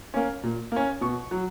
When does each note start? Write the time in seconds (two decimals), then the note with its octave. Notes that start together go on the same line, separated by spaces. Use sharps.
0.14 A#3 C#4
0.43 A#2
0.72 A#3 C#4
1.01 B2 C#6
1.31 F#3